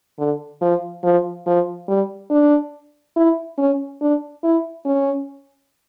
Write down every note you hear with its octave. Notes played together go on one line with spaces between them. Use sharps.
D3
F3
F3
F3
G3
D4
E4
C#4
D4
E4
C#4